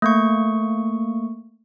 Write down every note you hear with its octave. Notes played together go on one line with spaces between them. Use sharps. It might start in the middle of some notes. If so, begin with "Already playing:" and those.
A3 A#3 C#6